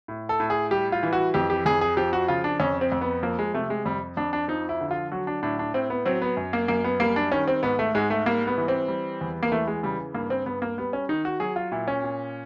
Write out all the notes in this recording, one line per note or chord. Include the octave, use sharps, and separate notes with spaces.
A2
A4
A2
G#4
G3 G4
F4
E3
F#4
F2 G4
G4
F2 G#4
G#4
F3 G4
F#4
C#3 F4
D4
F2 C#4
C4
F2
B3
F3 A#3
G#3
C3 A3
G#3
F2 G3
F2 D4
D4
F3 D#4
E4
D3
F4
F#3 F#4
D4
A2 D4
D4
A2 C4
B3
F#3 C4
B3
F#2
A#3
F#2 A#3
B3
G3 A#3
D4
D#3 C#4
C4
G#2 B3
A3
G#2 G#3
A3
G3 A#3
B3
E3
C4
G3
E2
A#3
E3 A3
G#3
C#3 G3
G2 A#3
C4
G2 B3
A#3
G3 B3
C#4
D#3 D#4
F#4
F#3 G#4
F4
A#2 E4
C#4
A#2